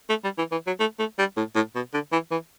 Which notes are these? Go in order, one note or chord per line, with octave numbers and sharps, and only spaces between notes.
A3
G3
E3
E3
F#3
A3
A3
G3
A2
A2
B2
D3
E3
E3